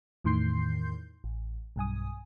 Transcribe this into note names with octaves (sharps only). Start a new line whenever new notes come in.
E2 A2 D#3 C6 G6 C7
A1
B1 G2 G#5 D#6